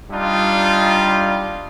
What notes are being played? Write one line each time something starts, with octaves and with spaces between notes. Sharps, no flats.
G3 D4 D#4 F4